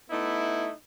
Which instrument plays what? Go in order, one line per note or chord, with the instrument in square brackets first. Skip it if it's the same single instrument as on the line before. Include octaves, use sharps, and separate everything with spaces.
[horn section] A3 B3 D#4 E4